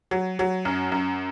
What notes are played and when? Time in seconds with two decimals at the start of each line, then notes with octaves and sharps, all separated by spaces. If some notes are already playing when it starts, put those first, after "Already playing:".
0.11 F#3
0.39 F#3
0.65 F#2
0.92 F#2